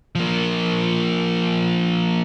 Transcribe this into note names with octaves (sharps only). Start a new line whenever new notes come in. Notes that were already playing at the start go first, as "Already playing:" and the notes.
F3 A#3